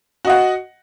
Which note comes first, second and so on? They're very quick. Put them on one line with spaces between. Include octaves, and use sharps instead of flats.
F#4 D#5 F#5